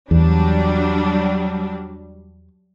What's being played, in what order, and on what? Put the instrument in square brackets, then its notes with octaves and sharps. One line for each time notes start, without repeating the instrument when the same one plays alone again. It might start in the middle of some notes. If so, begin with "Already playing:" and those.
[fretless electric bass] E2 [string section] F#3 G3 D4